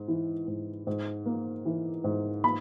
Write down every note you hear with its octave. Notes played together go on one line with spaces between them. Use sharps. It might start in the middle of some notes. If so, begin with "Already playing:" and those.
Already playing: G#2 G#3
E3
G#2
G#2
A#3
E3
G#2
A#3 B5